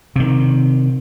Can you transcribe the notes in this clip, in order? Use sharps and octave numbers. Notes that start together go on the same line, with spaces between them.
C3 D#3